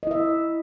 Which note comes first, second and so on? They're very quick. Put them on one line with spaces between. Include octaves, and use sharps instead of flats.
D#5 E4 E5